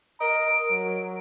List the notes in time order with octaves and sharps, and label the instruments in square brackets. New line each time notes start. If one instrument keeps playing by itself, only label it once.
[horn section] A#4 D#5 A#5 [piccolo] D7
[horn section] F#3